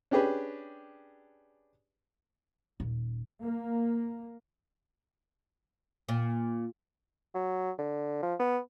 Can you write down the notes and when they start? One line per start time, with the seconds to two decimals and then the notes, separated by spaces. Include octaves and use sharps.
0.11 C#4 D4 G4 G#4 B4
2.80 D#1
3.43 A#3
6.09 A#2
7.35 F#3
7.78 D3
8.23 F3
8.39 B3